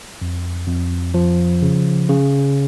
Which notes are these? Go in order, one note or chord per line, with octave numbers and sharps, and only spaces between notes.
F2
F2
F3
C#3
C#3